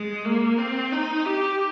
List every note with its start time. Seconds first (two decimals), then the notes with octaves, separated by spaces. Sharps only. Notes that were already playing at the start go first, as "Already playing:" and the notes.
Already playing: G#3
0.25 A#3
0.58 C4
0.92 D#4
1.26 G4